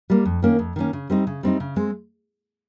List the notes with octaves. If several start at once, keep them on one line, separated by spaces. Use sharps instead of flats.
G3 A#3
F2
D#3 A#3 C#4
F2
D#3 A#3 C#4
C#3
G3 C4 D#4
C#3
G3 C4 D#4
C#3
G#3 C4